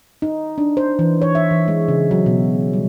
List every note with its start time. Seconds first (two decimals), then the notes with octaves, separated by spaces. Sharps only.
0.22 D#4
0.58 D4
0.77 C5
0.99 E3
1.22 C#5
1.35 E5
1.51 E3
1.68 G#3
1.88 C#3
2.11 F#3
2.26 B2
2.73 G3